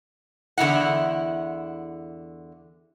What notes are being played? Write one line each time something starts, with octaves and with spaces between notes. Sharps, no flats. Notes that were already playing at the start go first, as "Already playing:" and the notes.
E2 D3 E3 D#4 E4 F#5